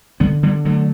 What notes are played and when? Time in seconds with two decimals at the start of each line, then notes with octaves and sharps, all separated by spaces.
0.20 D3 G3 B3
0.43 D3 G3 B3
0.65 D3 F#3 A3